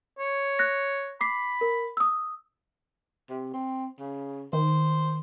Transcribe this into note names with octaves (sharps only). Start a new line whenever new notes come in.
C#5
F#6 A#6
B5 D6 C7
A#4
D#6 E6
C3
C4
C#3
D#3 C5